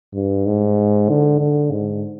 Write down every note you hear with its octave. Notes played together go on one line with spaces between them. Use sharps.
G2
G#2
D3
D3
G#2